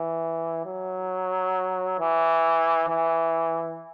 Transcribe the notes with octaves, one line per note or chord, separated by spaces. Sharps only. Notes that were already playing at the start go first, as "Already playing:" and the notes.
Already playing: E3
F#3
E3
E3